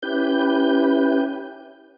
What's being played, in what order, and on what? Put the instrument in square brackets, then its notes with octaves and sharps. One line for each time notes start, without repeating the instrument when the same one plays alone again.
[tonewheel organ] C#4 E4 G4 B4 G6